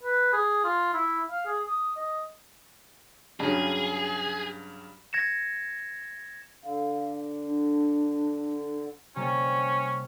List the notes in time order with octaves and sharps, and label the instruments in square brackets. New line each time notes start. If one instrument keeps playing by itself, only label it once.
[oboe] B4
G#4
F4
E4
F5
G#4
D#6
D#5
[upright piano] G2 C#3 F#3 [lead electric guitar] G#4
[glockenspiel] G#6 A#6 C#7 E7
[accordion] D3 [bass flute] F5
[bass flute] D4
[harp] C3 G3 A#3 [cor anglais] C#4